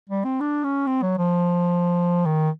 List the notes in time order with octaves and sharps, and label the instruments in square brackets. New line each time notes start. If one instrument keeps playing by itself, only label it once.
[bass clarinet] G3
C4
D4
C#4
C4
F#3
F3
D#3